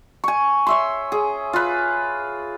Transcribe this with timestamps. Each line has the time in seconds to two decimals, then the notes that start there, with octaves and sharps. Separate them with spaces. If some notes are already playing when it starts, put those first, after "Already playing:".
0.24 G#5 C#6
0.67 C#5 E5 C6
1.12 G#4
1.53 F4 B4